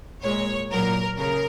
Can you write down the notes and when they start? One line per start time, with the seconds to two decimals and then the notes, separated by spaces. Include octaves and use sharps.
0.23 A#2 G#3 C#5
0.70 A#2 F#3 A#4
1.18 C#3 A#4